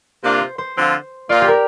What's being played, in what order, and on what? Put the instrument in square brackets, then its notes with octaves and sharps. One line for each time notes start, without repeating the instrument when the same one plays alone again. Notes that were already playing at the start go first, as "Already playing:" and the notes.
[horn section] C3 A#3 D4 F4
[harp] C5
C5
[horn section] D3 F3 C4 F4
[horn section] A#2 A#3 F4 [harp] D5
[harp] G4
A#4